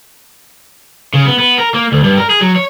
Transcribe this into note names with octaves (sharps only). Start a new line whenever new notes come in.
C#3
B3
B3
A#4
A#3
D2
G2
A#4
G#4
F#3
C#5